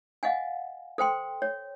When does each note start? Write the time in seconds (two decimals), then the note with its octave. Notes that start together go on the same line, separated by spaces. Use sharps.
0.23 D#5 F5 F#5 G#5
0.98 A4 C5 G5 C6
1.42 C#5